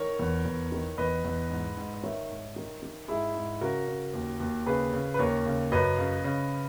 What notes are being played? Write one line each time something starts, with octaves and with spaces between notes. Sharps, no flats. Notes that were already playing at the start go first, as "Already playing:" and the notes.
Already playing: D#3 A#4 C#5
E2
E2
D#3
E2 B4 D#5
E2
G#2
G#2
D#5
D#3 C#5 E5
G#2
D#3
D#3
G#2 E4 G#4
G#2
C#3 F#4 A#4
C#3
D#2
D#2
C#3 G#4 B4
C#3
B4
D#2 A#4 C#5
C#3
F#2 B4 D#5
C#3
C#3